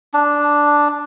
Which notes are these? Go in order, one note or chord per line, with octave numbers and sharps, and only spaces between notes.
D4